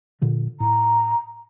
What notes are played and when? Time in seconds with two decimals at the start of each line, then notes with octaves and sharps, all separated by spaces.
0.21 A#2 D3 F3
0.60 A2 A#5